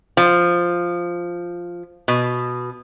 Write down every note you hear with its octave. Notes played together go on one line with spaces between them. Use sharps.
F3
B2